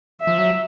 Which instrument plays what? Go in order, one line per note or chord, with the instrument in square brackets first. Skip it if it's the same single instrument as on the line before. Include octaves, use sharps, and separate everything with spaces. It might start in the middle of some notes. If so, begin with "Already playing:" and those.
[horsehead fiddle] E5
[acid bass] F3
F#3